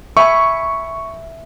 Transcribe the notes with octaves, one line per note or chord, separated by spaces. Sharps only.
E5 G#5 B5 C#6